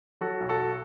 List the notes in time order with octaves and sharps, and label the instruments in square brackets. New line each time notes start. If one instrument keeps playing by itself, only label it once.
[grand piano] F#3 F#4 A4
B1
F#4 A4
B1